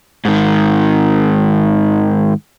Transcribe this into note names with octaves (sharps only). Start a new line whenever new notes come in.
G#2 D#3